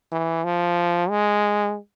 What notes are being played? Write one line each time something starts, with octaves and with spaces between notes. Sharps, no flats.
E3
F3
G#3